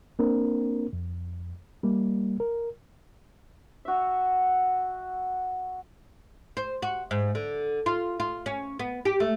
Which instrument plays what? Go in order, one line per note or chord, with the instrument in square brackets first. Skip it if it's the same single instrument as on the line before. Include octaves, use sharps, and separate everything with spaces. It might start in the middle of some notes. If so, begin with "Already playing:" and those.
[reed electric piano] A#3 C4 D4 A#4
F2
G3 A#3
A#4
[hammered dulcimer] F#4 E5
[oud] C5
F#4
G#2
D3
F4
F4
C#4
B3
G4
A3